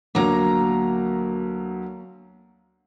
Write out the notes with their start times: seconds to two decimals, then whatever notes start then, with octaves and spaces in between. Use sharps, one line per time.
0.15 D2 F#3 A#3 A#5